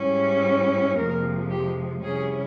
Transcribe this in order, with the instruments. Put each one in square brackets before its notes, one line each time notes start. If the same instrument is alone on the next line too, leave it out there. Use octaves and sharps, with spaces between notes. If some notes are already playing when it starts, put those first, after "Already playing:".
Already playing: [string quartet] G#2 G3 C#4 E4
F2 C3 F3 G#3 A#3 A#4
G4
C3 G3 C#4 E4 G#4